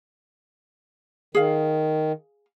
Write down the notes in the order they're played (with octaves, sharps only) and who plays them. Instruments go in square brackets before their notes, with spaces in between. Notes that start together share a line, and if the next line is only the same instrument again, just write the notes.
[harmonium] D#3 [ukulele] G#4 F5